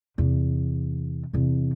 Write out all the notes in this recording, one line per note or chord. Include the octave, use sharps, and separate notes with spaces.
E2 C3
E2 C3